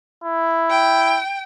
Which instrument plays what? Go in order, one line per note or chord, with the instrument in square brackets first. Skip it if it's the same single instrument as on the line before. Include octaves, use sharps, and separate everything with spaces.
[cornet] E4
[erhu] G5